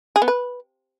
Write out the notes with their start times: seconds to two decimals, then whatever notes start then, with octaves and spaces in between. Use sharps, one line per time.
0.16 G#4
0.22 B3
0.28 B4